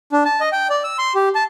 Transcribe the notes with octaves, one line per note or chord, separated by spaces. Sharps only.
D4
A5
D#5
G5
D5
E6
C6
G4
A5